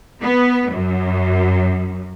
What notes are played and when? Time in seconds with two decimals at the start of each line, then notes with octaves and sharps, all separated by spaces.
0.22 B3
0.71 F#2